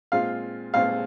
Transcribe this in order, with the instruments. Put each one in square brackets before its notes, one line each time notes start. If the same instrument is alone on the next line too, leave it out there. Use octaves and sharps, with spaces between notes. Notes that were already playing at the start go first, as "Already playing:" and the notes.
[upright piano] A#2 G#3 C4 F4 [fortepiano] F5
[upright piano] A#2 G#3 C4 F4 [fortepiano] F5